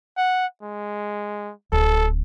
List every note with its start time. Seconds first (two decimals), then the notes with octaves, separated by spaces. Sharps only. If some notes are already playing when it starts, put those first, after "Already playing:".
0.17 F#5
0.62 G#3
1.72 D1 A4